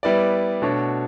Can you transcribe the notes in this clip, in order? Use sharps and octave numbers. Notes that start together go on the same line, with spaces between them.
G3 B3 E4 B4 D5
B2 A3 D4 F#4 C#5